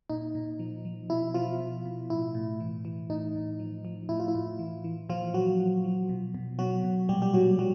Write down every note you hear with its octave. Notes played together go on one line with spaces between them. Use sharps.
A#2 D#4
A#2
F3
F3
B2 E4
B2 F3 F4
B2
B2
A2 E4
A2
E3
E3
A2 D#4
A2
F3
F3
A2 E4
F4
E4
A2
E3
E3
A#2 F3 F4
A#2 F#3 F#4
F3
F3
B2
B2
B2 F#3 F#4
B2
A#2 G3 G4
G3 G4
A#2 F#3 F#4
F3 F#3 F#4